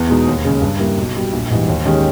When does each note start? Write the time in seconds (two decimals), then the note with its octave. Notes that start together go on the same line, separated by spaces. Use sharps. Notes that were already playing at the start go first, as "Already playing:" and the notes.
Already playing: E2
0.09 B2 G#3 D#4
0.27 D#2
0.44 C#3 G#3 C#4
0.62 G2
0.79 G3 A#3 E4
0.97 B1
1.15 B2 G3
1.33 A#1
1.50 G#2 E3 G3
1.68 D#2
1.85 D#3 G#3 C#4 G4